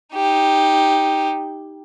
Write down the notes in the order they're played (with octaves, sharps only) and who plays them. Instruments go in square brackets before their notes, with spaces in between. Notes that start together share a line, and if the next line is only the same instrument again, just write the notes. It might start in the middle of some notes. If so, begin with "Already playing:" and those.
[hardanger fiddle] D#4 G4